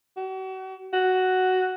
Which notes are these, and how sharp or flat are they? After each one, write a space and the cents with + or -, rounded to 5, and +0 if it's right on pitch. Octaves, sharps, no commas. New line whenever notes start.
F#4 +40
F#4 +5